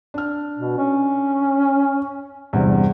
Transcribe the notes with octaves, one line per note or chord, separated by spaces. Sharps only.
D4 F6
B2
C#4
E2 G2 C3